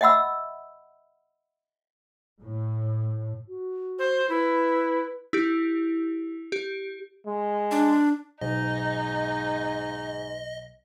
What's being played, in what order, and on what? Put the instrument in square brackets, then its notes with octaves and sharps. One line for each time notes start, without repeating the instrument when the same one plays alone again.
[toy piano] D#5 E5 F#5 B5 E6
[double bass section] A2
[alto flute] F#4
[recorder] C5
[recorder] E4 [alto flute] B4
[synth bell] E4 G4
G4
[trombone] G#3
[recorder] D4
[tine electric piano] B1 [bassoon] G#2 [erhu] D#4 [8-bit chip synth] D#5